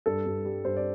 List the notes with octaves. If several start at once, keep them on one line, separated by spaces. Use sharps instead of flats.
G2 A4
G2
G3
G2 C5
D5